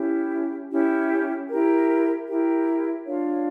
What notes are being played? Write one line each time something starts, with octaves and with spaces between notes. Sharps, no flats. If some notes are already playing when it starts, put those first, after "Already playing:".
Already playing: C#4 E4 G4
C#4 E4 G4
E4 G4 A#4
E4 G4 A#4
D4 F4 C#5 F5